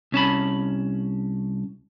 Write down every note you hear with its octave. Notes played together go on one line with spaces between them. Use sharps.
C2 C#4 A5 B5